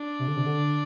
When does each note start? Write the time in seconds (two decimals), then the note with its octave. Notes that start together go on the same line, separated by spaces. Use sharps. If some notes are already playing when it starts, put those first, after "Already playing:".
Already playing: D4
0.19 C3
0.28 D3
0.37 C3
0.46 D3